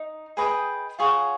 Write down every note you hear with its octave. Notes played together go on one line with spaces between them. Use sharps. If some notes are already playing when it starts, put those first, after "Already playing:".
Already playing: D#4
G#4 B4 D#5 G5
F4 G#4 C#5 F#5